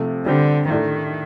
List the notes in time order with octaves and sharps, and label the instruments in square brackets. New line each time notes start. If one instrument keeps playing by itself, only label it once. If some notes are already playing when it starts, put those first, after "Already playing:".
Already playing: [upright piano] C3 F3 A3
[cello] D3 [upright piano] G3 C4 G4
[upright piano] A2 A3 D4 [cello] D#3